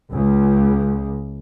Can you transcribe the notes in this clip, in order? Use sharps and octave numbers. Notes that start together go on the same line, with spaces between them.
C#2